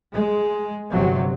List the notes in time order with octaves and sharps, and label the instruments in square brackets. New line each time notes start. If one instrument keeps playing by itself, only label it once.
[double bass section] G#3
G1 C3 F#3